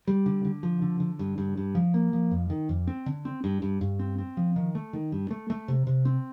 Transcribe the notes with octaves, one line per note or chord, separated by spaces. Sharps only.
G3
D3
D3
F3
D3
D3
G2
G2
G2
F3
A#3
F3
F2
D#3
F2
C4
D3
C4
G2
G2
G2
C4
C4
F3
D#3
A3
D#3
G2
A3
A3
C3
C3
C4